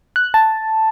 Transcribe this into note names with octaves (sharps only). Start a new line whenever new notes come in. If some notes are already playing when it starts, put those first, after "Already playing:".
F#6
A5